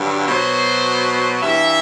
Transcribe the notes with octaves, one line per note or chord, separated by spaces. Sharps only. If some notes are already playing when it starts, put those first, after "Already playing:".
Already playing: G2 D3 F#3
B2 F#3 C5
G2 E3 E5